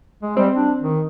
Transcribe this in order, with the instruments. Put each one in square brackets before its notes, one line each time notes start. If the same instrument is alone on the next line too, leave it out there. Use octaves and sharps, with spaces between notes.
[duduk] G#3
[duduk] G3 [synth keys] C4
[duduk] D4
D#3